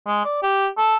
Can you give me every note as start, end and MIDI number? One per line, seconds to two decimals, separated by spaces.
0.07 0.20 56
0.25 0.39 74
0.43 0.67 67
0.77 0.97 69